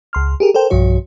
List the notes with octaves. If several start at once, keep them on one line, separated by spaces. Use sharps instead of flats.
C#2 C6 F6
G4 G#4 A#4
A4 A#4 C5 G5
B1 G2 F3 F#4 C#5